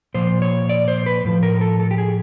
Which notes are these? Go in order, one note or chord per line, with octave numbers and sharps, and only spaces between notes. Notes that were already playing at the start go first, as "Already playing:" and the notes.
A#2 F3 C5
C#5
D5
C5
B4
A2 F3
A#4
A4
A4
G4
G#4